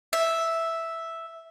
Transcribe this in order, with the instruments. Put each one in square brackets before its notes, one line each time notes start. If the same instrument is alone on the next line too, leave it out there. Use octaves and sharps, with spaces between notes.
[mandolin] E5